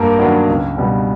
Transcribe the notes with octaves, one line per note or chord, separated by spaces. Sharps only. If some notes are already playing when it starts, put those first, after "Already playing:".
Already playing: G2 A#3 A#4
D#3 F#3 B3 D4
C#2
B2 G3 B3